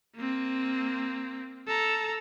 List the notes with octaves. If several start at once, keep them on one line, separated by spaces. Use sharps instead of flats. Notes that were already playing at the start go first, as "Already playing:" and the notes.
A#3 C4
A4 A#5